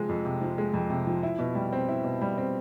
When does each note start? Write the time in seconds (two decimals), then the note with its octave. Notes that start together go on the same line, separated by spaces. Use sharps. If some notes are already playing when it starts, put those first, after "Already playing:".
Already playing: C3 F3 G#3
0.09 F2
0.25 C3
0.41 F3
0.58 G#3
0.74 F2
0.90 C3
1.07 F3
1.23 E4
1.39 B2
1.55 G3
1.72 C4
1.89 E4
2.04 B2
2.21 G3
2.38 C4